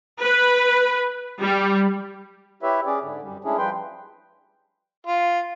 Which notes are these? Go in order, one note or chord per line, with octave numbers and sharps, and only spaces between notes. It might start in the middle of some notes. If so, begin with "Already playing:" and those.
B4
G3
E4 G4 B4 C#5 E5
C#4 G#4 D5
G#2 D3
F#2 G3
G#3 A3 C#4 D4 E4 G#4
F3 G3 B4 G5 C6
F4